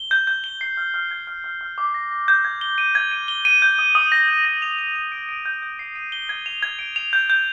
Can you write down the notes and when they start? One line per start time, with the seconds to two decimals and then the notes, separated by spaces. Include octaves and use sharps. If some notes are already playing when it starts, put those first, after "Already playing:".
Already playing: G7
0.11 G6
0.27 G6
0.44 G7
0.61 C7
0.77 F6
0.94 F6
1.11 G#6
1.27 F6
1.44 F6
1.61 F6
1.78 D6
1.94 A#6
2.11 A#6
2.28 G6
2.45 G#6
2.61 G7
2.78 D#7
2.95 G#6
3.12 D#7
3.28 G7
3.45 D#7
3.62 G6
3.79 D#6
3.95 D#6
4.12 A#6
4.28 G6
4.45 A#6
4.62 F7
4.79 F7
4.95 F7
5.12 D7
5.29 D7
5.46 G6
5.62 G6
5.79 C7
5.95 D#7
6.12 G7
6.29 G#6
6.46 F7
6.63 G#6
6.79 D7
6.96 F7
7.13 G6
7.30 G6